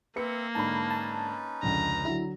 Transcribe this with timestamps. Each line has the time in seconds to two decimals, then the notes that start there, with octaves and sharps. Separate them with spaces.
0.16 A#3 C4 B4 E5 C#7
0.55 G#2 D3 C#4 D#4 B4 A5 B5
0.90 A5
1.63 F1 C#2 D3 A#5
2.05 D3 F#3 E4